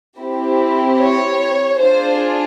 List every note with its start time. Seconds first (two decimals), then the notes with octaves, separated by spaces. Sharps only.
0.19 C4 E4 G4
1.00 C#5
1.80 D4 F4 G#4 C5